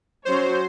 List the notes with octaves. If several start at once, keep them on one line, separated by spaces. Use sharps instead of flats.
F#3 C#4 F#4 C5 C#5